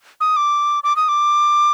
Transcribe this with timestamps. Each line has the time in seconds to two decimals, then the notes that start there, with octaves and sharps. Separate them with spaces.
0.21 D#6
0.37 D6
0.84 D6
0.96 D#6
1.09 D6